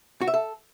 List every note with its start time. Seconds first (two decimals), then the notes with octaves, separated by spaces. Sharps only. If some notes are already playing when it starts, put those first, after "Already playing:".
0.21 F#4
0.27 E5
0.34 A4